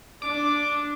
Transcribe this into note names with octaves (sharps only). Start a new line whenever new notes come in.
D4 D6